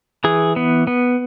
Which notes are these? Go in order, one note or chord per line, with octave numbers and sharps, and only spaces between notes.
E3 G#4
B3
B3